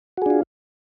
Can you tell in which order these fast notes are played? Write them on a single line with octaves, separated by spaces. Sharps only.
F#4 G#4 D4 F4